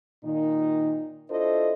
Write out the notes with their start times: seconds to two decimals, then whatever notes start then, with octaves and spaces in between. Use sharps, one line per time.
0.25 A#2 D#3 D#4
1.30 D4 E4 F4 A4 C5 D#5